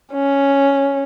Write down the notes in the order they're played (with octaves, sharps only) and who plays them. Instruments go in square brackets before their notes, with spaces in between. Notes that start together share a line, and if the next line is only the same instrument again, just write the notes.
[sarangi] C#4